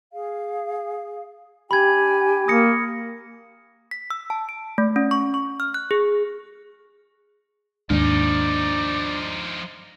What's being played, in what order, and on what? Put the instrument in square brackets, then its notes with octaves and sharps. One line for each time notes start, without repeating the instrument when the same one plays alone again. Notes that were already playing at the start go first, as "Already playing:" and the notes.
[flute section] G#4 F5
[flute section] D4 G5 G#5 [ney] G4 [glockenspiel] B5 G#6
[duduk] A#3 [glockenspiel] D#6 A#6 C#7
[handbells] B6
E6
A5
D7
A3
C#4
C#6
C#6
F6
F#6
G#4
[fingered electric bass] D#2 G#2 [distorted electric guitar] F3 D#4 [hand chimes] D4 [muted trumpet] D5